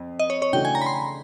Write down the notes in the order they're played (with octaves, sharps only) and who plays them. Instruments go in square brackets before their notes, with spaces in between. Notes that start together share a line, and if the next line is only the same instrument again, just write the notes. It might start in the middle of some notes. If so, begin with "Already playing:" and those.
Already playing: [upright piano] F2
[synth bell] D#5
C#5
C#5
[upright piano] C#3 E3 A3 D4 F#4 [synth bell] G5
[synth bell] G#5
A#5
B5
C6